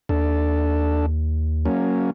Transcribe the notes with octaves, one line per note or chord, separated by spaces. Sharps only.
D#2 D4 A4
F#3 A#3 C#4